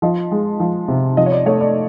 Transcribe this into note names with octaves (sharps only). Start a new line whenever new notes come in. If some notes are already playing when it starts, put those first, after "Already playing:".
F3 D#5
G#3
F3
C3
F3 D#5
C#5
D5
A3 C#5
D5